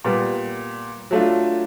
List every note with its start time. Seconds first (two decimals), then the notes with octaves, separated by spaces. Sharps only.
0.04 A#2 G3 B3
1.11 F#3 A3 D4 F4